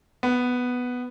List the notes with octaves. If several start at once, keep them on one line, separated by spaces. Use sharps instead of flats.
B3